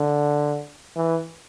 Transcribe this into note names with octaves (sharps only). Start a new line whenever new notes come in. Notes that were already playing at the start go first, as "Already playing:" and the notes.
Already playing: D3
E3